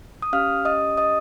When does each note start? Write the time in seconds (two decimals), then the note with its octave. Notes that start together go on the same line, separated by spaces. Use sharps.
0.22 D#6
0.33 C#4 G4 F5 F6
0.65 D#5 D#6
0.97 D#5 D#6